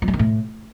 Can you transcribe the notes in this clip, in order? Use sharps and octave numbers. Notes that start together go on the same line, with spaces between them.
F3
F#3
D#3
A2